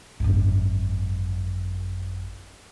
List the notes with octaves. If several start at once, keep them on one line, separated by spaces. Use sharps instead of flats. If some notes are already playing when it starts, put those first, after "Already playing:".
G#1 F#2